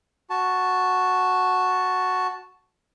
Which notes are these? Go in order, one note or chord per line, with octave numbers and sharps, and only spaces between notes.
F#4 A5